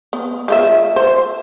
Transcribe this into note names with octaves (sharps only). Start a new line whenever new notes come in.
B3
G#3 F4 E5
C5